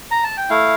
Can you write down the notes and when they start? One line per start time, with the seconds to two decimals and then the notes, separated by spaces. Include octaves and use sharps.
0.11 A#5
0.24 A5
0.37 G5
0.50 A3 E4 F5